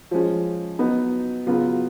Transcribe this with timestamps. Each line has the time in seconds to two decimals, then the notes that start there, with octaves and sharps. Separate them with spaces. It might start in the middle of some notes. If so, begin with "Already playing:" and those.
0.11 F3 G#3 C#4
0.79 F#3 B3 D#4
1.46 C#3 F#3 B3 F4